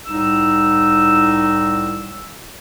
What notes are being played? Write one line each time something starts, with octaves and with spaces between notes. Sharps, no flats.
C2 A2 D#4 E6